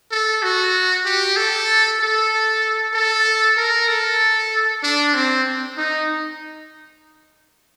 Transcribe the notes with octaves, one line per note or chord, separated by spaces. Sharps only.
A4
F#4
G4
A4
A4
A4
A#4
A4
D4
C4
D#4